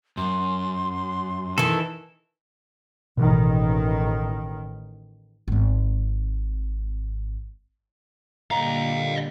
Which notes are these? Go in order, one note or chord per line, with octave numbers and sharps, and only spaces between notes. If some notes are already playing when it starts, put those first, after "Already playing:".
F#2 C6
D#3 E3 A4
A1 B2 D#3 E3
G#1 C4
A#2 D3 G3 D#5 F5 A#5